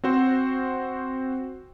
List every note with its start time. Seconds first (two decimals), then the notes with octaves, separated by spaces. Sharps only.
0.04 C4 F#4 C5